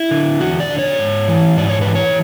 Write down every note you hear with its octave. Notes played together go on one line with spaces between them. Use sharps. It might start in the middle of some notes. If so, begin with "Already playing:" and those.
Already playing: E4
D3
E2 F#4
D5
D3
C#5
G#2
E3
G#2 D5
C#5
B4
E3
C#5